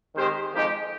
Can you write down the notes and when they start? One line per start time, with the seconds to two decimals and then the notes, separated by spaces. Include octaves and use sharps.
0.16 D#3 G#3 C4 G4 C5
0.52 F2 D#3 G#3 D#4 G4